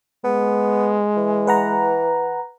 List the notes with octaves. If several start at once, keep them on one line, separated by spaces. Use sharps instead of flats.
G#3 B3
E3
B4 F#5 A#5